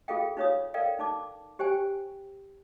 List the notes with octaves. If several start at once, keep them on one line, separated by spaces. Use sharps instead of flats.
F4 G#4 A4 F5 G5
D#4 F4 B4 C#5 F5 D#6
A4 A#4 D5 F5 G5
D#4 A5 D6
G4 C5 G5 G#5